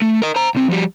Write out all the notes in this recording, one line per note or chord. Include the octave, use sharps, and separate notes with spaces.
A3
A#4 D#5
C5 A#5
C2 C4
F3 G3